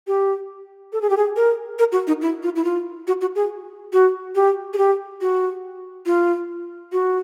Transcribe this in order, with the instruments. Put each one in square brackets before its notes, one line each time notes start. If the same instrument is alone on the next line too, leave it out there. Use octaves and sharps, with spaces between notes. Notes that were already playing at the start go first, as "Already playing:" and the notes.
[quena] G4
A4
G#4
G4
G#4
A#4
A#4
F#4
D#4
E4
F4
E4
F4
F#4
F#4
G#4
F#4
G4
G#4
G4
F#4
F4
F#4